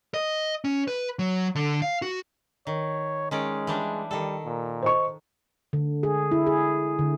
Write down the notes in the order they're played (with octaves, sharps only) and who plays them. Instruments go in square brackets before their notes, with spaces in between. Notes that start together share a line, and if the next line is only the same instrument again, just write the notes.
[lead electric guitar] D#5
C#4
B4
F#3
D3
F5
F#4
[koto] D#3 [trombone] C#5
[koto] D#3 C#4 D5 [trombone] G#3
[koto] E3 G3 D4
[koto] D#3 A4 [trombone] G3
[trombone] A#2
[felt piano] C5 D#5 C#6
[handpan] D3
G#4
E4
G#4
D3